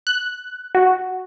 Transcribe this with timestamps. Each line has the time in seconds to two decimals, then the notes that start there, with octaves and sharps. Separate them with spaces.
0.07 F#6
0.75 F#4